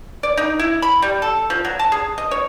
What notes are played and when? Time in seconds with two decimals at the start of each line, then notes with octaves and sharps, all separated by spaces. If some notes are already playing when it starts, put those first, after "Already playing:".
0.23 D5
0.37 D#4
0.59 E4
0.82 B5
1.02 G3
1.22 A4
1.50 F3
1.65 F#3
1.79 A5
1.92 G#4
2.18 D#5
2.31 C#5